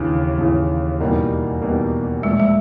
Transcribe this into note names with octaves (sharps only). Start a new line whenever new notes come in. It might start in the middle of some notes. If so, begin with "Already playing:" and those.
Already playing: D#2 C#3 E3 D4
D#2 C#3 E3
E2 B2 G3 A#3 D#4
E2 B2 G3 A#3 D#4
A#2 F3 G#3 A3
G#3